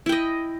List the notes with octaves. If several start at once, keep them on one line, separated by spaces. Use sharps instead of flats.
E4 D#5 G5